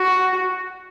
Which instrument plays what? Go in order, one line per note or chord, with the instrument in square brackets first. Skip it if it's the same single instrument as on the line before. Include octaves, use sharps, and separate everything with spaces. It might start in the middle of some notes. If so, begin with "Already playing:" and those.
Already playing: [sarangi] F#4